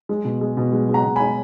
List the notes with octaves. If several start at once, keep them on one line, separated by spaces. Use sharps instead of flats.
G#3
B2
G#3
B2
G#3
G#3
F#5 A#5
B2
G#5 B5
G#3